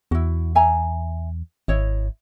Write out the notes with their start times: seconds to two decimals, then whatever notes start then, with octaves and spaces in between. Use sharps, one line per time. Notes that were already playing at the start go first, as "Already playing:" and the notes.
0.11 E2 E4 F#4
0.55 E5 G#5 A#5
1.68 G#1 E4 C#5 D#5